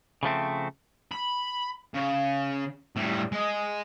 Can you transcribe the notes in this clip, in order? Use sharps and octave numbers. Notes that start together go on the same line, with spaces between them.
C#3 F3 A3 C4
B5
C#3
A2 G3
G#3